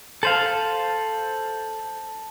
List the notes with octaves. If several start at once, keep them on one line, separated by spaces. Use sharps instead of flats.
A4 C5 F5 A5 F#7